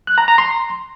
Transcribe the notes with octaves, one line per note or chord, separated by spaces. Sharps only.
F#6
A#5
A#5
C6